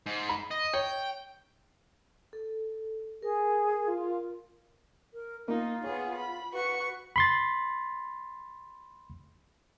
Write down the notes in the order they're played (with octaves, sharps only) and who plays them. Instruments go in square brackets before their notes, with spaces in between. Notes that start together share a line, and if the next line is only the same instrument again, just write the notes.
[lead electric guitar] G#2
[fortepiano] B5
[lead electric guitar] D#5
[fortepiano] C#5 [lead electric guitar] G5
[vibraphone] A4
[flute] G#4 [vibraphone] A#4
[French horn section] F4
[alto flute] A#4
[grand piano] A#3 [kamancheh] D#4 [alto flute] F4
[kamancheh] B3 G#4 [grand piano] C#5
[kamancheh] B5
[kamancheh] F#4 C#6 [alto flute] B4
[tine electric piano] B5 C6 A6